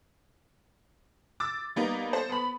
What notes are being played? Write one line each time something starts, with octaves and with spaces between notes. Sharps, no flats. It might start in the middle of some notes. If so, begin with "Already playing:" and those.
D6 E6 A6
G3 A#3 B3 D#4
A4 C5
B3 B5